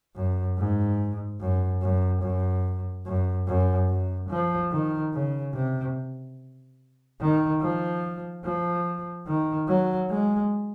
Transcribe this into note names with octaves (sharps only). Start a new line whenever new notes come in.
F#2
G#2
F#2
F#2
F#2
F#2
F#2
F#2
F3
D#3
C#3
C3
D#3
F3
F3
D#3
F#3
G#3